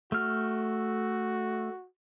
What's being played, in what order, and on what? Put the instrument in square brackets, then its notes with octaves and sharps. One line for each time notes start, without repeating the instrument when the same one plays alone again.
[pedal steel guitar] A3 F6 [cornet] F#4